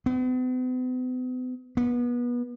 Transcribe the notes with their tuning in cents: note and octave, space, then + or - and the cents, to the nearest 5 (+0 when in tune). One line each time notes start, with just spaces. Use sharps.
B3 +45
B3 -30